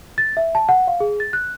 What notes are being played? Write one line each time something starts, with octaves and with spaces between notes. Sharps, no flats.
A6
E5
A5
F#5
F5
G#4
A6
F#6